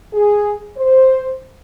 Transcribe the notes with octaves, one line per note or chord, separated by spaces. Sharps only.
G#4
C5